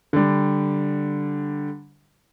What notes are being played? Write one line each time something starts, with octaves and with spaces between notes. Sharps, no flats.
D3 G3